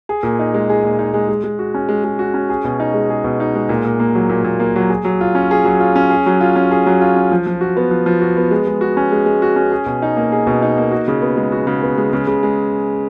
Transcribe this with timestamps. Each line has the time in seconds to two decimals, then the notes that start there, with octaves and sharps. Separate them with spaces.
0.09 G#4
0.23 A#2
0.39 D#4
0.54 G#3
0.69 G#4
0.84 A#2
0.99 D#4
1.14 G#3
1.29 G#3
1.44 G#3
1.59 F#4
1.74 C#4
1.89 G#3
2.04 G#3
2.19 F#4
2.34 C#4
2.50 G#4
2.64 B2
2.80 D#4
2.94 G#3
3.10 G#4
3.24 B2
3.40 D#4
3.55 G#3
3.69 A#2
3.85 A#2
4.00 A#3
4.15 F#3
4.30 A#2
4.44 A#2
4.60 A#3
4.76 F#3
4.90 G#4
5.05 F#3
5.21 F4
5.35 C#4
5.51 G#4
5.65 F#3
5.80 F4
5.96 C#4
6.10 G#4
6.26 F#3
6.41 F4
6.56 C#4
6.71 G#4
6.86 F#3
7.01 F4
7.16 C#4
7.32 F3
7.47 F3
7.61 F#4
7.77 B3
7.91 F3
8.06 F3
8.21 F#4
8.37 B3
8.51 G#3
8.67 G#3
8.81 F#4
8.97 C#4
9.12 G#3
9.26 G#3
9.42 F#4
9.56 C#4
9.72 G#4
9.86 B2
10.02 D#4
10.17 A#3
10.32 G#4
10.47 B2
10.62 D#4
10.78 A#3
10.92 F#4
11.08 C#3
11.22 B3
11.37 G#3
11.52 F#4
11.67 C#3
11.82 B3
11.98 G#3
12.13 C#3
12.27 C#3
12.43 G#3